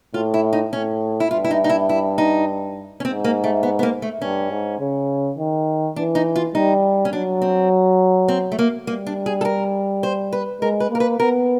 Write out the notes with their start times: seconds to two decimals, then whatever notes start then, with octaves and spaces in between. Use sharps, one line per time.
0.14 A2 F4
0.34 E4
0.53 D#4
0.73 A2 C#4
1.20 E4
1.31 G2 F4
1.44 E4
1.51 D#4
1.64 D#4
1.69 E4
1.89 E4
2.18 D#4
3.00 C#4
3.05 G#2 C4
3.24 A#3
3.44 A3
3.63 B3
3.79 B3
3.83 A#3
4.02 A3
4.21 G2 C#4
4.51 G#2
4.80 C#3
5.38 D#3
5.96 E3 D4
6.15 D#4
6.36 F4
6.55 G3 D#4
7.05 C#4
7.12 F#3 D4
7.42 C4
8.28 C4
8.52 A3
8.59 A#3
8.87 G3 A#3
9.07 D4
9.26 G#4
9.41 A4
9.45 A#4
10.03 C5
10.33 B4
10.61 G#3 A#4
10.80 B4
10.90 A#3 A#4
11.00 B4
11.20 B3 A#4